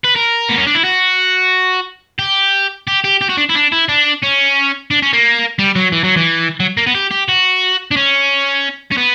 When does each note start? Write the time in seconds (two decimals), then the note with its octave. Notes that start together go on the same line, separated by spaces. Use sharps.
0.04 B4
0.15 A#4
0.49 B3
0.58 C#4
0.67 D4
0.75 E4
0.84 F#4
2.19 G4
2.87 G4
3.04 G4
3.21 G4
3.29 F#4
3.38 D4
3.50 E4
3.55 D4
3.72 E4
3.89 D4
4.22 C#4
4.91 D4
5.03 C#4
5.13 A#3
5.59 G3
5.76 F#3
5.92 E3
6.04 F#3
6.17 E3
6.60 F#3
6.77 A#3
6.86 B3
6.94 G4
7.11 G4
7.28 F#4
7.91 D4
7.97 C#4
8.91 C#4
8.97 B3